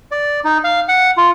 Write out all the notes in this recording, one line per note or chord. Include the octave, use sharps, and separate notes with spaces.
D5
D#4
F5
F#5
F4